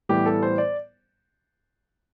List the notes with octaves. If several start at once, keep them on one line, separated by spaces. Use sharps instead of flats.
A2 E3 G3 B3 G4
A4
C5
D5